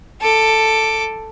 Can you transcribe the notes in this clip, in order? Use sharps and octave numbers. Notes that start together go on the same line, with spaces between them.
A4 D6